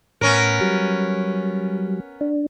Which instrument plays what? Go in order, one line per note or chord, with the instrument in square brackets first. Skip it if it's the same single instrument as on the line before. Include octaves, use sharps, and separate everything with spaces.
[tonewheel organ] A2 [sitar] B3 C#4 A#4
[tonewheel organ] F#3 G3
D4